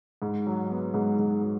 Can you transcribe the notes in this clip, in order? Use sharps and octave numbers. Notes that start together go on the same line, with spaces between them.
G#2
F#3
B3
G#2
G#2
F#3